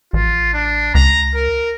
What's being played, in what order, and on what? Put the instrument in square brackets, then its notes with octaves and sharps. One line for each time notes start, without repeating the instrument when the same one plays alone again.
[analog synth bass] A1 [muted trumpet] F4
[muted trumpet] D4
[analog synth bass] C#2 [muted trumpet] A#5
[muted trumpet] A#4